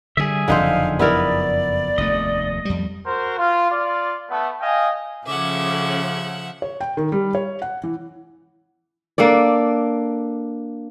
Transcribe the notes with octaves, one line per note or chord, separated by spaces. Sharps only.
D3 F#3 G3 G#4 E5
F#1 F2 D3 F3 D#4 C5 F5
B3 E4 A#4 D5
F1 D#2 A3 D#5
F2 G3
F#4 A#4 C5
F4
F4 D5
A3 B3
D#5 F5 G5 G#5
C#3 F3 C#4 G#4 A4 E5 F#5 D6
C#5
G5
D#3
G3
C#5
F#5
E3
A#3 D4 A4 D5